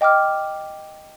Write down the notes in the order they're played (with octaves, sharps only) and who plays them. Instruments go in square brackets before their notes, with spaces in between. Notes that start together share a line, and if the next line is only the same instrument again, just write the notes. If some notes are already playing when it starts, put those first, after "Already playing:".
[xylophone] D#5 G5 D6 F6